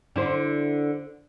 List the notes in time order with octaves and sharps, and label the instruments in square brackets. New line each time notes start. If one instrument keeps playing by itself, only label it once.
[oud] D3 E4 C5